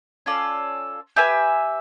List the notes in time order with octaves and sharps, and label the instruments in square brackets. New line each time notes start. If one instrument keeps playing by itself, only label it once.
[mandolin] C#4 F4 A4 D5
G4 B4 E5 G#5